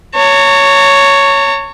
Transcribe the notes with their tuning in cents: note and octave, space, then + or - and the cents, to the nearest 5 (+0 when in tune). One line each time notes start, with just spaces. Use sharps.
C#5 +5 A#5 -45